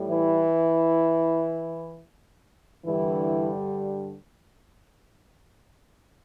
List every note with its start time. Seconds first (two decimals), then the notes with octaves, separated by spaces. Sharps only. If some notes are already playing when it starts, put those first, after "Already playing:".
Already playing: A2 G3
0.08 E3 E4
2.86 G2 D3 E3 G3 E4